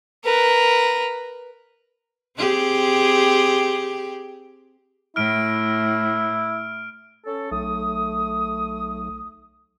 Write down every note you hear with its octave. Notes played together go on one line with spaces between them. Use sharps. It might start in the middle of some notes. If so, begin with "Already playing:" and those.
A#4 B4
C4 G4 G#4
A2 E4 F6 D7
C#4 A4
B1 A3 D#6